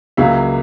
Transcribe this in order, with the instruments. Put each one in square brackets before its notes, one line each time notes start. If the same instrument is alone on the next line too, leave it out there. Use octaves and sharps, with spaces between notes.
[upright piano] C#2 C#3 F#3 A#3 E5